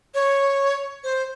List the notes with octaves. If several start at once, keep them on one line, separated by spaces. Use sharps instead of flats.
C#5
C5